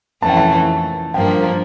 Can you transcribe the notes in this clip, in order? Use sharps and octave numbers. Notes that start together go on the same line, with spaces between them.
F2 E3 A3 C#4 A5
G5
A5
G2 F3 A#3 G5